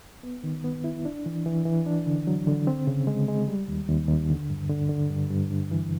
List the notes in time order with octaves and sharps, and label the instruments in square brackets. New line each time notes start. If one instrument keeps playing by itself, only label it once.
[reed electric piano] B3
D#3
B3
E4
D4
E3
E3
E3
D4
D3
F#3
D3
C4
C#3
G#3
G#3
G3
D#2
D#2
D#2
D3
G2
D3
D3
G2
G2
G2
E3